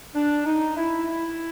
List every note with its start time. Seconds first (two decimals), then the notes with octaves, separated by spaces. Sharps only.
0.15 D4
0.46 D#4
0.77 E4
1.08 E4